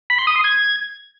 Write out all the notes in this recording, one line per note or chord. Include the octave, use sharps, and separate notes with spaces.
B5
C6
D#6
C6
G#6